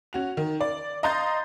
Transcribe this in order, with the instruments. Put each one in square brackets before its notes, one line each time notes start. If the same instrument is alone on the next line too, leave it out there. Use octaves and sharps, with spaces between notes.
[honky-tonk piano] C#4 F#4 F7
D#3
D5
D#5 F5 A#5 C6 G6 A6